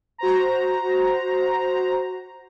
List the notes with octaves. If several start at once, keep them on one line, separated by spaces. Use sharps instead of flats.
F#4 C5 A#5